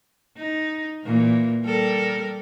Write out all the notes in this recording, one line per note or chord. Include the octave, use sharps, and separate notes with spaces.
D#4
A#2 E3
G3 A4 A#4